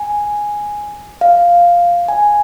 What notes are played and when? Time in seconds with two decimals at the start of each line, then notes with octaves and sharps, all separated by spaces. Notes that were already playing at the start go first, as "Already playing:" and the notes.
Already playing: G#5
1.21 F5
2.09 G#5